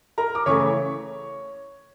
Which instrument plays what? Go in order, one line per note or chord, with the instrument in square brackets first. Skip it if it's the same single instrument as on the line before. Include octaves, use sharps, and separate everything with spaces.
[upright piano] A#4 A#5
D6
C#3 E3 A3 C#5 C#6